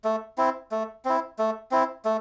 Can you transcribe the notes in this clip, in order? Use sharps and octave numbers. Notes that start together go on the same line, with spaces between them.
A3
C4 E4
A3
C4 E4
A3
C4 E4
A3